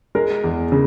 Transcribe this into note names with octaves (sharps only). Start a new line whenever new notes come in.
G#3 A#4
E2
C#3